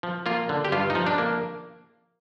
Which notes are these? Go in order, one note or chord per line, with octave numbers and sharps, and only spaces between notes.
F3
A#3 F4
D3
G4
G2 F4
D#4
F3
D4
A#3